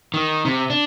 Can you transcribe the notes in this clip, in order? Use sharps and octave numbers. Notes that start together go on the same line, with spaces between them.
D#3
C3
D4